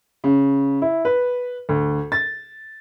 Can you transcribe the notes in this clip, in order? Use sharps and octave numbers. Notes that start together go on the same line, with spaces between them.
C#3
E4
B4
D2
A6